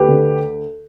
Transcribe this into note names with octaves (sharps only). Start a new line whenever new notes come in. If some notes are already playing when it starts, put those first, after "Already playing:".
Already playing: D2 G4 B4
D3